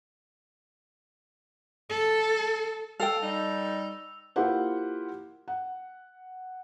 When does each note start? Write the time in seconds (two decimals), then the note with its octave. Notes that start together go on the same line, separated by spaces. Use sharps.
1.90 A4
3.00 A4 F5 G5 E6 F7
3.22 G3 D#4
4.36 A#3 E4 F4 G4 C5 F#5
5.48 F#5